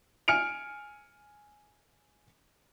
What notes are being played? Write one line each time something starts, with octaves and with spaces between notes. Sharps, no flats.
G#5 F6 C#7 D7 F7